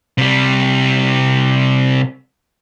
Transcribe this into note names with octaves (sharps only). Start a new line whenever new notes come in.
C3 G3